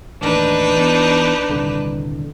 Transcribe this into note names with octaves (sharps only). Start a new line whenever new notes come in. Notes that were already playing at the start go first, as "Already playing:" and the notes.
A1 D#2 D4 D#4 B4
E2
D#1 C2 D3